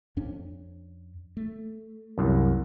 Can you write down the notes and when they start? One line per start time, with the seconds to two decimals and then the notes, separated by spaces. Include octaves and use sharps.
0.17 F2 C#4 D4
1.37 A3
2.18 C2 F#2